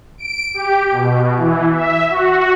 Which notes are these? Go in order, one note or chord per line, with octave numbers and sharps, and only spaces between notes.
D7
G4
B2
E3
E5
F#4